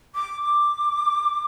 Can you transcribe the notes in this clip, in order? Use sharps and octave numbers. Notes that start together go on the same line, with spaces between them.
D6
D6